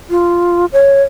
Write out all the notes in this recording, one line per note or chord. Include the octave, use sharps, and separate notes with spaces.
F4
C#5